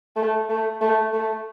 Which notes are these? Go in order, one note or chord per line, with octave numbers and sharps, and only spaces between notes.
A3
A3
A3
A3